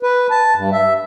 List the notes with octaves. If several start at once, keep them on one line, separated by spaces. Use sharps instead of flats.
B4
A5
G2
E5